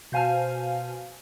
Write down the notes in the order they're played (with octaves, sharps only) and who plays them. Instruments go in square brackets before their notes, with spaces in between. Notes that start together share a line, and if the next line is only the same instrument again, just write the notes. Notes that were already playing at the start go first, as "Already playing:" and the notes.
[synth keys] B2 C5 F5 G#5 A5 F6